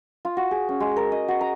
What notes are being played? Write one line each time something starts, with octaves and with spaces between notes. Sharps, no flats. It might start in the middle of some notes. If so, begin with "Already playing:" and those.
F4
F#4
G#4
C#4
G#3
A#4
D#5
F#4
A#5